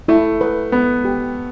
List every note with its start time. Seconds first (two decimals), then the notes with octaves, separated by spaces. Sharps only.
0.08 A3 E4
0.41 B4
0.72 B3 B4
1.05 G4